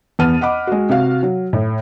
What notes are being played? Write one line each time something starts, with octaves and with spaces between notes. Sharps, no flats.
E2 B3 A5 F6 D#7
D#5 F#5 B5 D6
G#3 F#4
C3 F#4 F5
F#3
A2